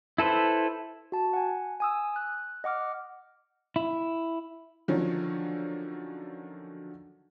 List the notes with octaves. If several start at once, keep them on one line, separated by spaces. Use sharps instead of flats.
E4 A4 B4 C5
F#4 A5
F#5 G#5
G#5 D#6 E6
F#6
D#5 F#5 D6 F6
E4
D3 D#3 F3 F#3 C#4